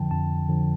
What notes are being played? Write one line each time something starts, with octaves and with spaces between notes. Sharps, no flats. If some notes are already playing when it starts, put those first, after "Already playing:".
Already playing: F2 D3 F3 G5 A5
F2 A5
D3 F3